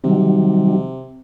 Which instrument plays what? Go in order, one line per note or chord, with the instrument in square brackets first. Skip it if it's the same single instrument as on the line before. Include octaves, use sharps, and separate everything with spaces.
[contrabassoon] C3 [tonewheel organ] D#3 F#3 G3